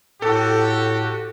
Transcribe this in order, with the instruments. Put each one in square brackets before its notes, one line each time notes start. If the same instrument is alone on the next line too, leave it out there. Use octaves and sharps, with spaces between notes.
[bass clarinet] A2 [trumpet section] F#4 G4 [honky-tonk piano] A4